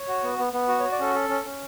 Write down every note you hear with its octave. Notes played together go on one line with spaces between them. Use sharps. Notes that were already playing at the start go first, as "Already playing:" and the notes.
Already playing: C#5
F#4
B3
B3
B3
F#4
C#5
F#4
D5
C#4 A4
A4
C#4
C#4